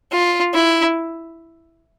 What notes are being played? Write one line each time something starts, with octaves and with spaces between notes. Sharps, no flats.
F4
E4